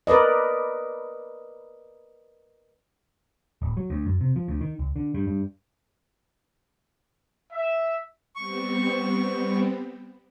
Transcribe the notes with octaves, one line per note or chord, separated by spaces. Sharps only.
A#4 B4 D5 D#5
D1
F#3
D2
F#2
C3
F3
D2
D#3
C#2
D3
G2
G2
E5
G3 B3 C4 C#6